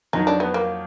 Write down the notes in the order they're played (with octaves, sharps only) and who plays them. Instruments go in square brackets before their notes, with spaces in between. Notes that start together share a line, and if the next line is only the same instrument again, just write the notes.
[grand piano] F2 D#3 F#3 [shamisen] D#4
[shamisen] D4
B3
A#3